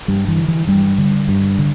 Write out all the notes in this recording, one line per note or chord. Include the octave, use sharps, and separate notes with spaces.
G2 G3
E3
D3
E3
G2 G3
D3
G2
D3